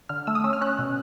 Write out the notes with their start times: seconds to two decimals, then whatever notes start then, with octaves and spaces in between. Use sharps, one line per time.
0.09 D3 F6
0.27 A3 E6
0.35 D#6
0.44 C#4 E6
0.53 F6
0.61 C#4 F#6
0.79 B2